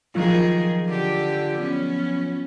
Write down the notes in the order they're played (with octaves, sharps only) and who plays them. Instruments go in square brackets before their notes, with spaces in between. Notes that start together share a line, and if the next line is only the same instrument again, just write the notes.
[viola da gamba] D#3 G#4 [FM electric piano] F3 F#3 F4
[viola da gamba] D3 G4
B3 C#4